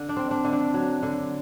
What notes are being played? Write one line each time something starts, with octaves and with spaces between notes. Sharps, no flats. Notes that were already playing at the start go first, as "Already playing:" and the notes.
Already playing: D3
D4
C4
D4
D3
D4
F#3
D3